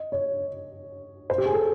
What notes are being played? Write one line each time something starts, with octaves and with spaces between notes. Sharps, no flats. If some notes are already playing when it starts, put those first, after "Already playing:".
Already playing: D#5
C#5
C5
G4
G#4
A4